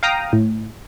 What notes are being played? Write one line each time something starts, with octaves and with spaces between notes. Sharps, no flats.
F5 G5 A#5 D#6
A2